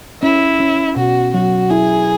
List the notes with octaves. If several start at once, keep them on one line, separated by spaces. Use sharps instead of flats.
C#4 E4
C#4
B2 F#4
F#3 F#4
E4 G#4